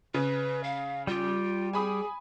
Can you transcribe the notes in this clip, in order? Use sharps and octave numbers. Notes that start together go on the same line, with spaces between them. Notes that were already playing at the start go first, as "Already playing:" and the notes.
C#3 B4
F5
G3 F4 G4
G#4 G#5 B5 D#6